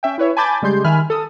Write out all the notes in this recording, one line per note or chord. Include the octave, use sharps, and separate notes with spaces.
C#4 E5 G5
E4 B4 C#5 E5
G#5 A5 B5 D6 G6 A6
C#3 G3 G#3 G4 C6 G6
D#3 E5 G#5 B5 F6
A4 D#6